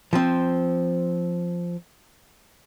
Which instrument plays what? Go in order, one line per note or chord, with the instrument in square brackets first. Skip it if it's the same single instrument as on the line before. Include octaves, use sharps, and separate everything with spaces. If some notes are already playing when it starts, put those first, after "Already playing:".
[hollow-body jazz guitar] F3 C4